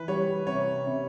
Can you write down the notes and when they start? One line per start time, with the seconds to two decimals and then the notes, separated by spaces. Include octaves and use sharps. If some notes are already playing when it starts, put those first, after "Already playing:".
Already playing: E3 B4
0.08 G3 C#5
0.47 C3 C#5
0.86 C3